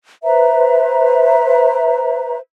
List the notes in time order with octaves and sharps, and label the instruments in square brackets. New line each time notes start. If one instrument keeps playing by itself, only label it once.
[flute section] B4 C5 E5 A#5